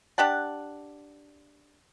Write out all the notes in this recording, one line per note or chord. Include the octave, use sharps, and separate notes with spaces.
D4 G4 F#5 A5